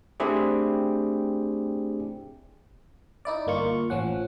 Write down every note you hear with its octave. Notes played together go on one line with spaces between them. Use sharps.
A3 C4 D4 E4 G4 G#4
D#4 E4 D5
G1 A#3 F4 C#6
A1 F3 C#4 F#5